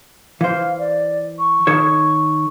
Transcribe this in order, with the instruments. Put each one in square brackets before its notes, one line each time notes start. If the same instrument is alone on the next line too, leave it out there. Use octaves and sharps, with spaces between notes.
[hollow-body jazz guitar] E3 C5 [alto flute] F5
[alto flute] D5
C#6
[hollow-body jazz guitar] D#3 A4 C#5